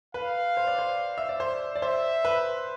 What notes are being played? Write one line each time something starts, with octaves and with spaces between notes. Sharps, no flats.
B4 F5
C5
D5
C5
E5
D5
C5
D5
C5 E5
B4